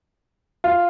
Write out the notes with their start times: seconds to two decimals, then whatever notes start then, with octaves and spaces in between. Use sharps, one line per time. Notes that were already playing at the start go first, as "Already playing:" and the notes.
0.64 F4